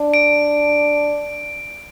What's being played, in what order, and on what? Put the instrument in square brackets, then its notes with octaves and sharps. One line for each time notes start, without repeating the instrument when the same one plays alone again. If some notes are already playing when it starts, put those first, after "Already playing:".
Already playing: [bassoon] D4
[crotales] D7